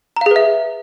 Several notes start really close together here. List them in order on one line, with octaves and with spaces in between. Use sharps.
A#5 F5 G#4 B4 E5